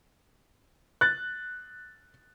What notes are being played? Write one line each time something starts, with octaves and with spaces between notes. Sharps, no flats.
F#6 A6